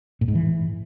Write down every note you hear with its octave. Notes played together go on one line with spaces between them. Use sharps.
A2
G#2
E3